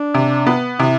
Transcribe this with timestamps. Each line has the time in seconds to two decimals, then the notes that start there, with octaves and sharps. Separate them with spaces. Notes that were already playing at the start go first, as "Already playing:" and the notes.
Already playing: D4
0.14 C3
0.47 B3
0.79 C3 E4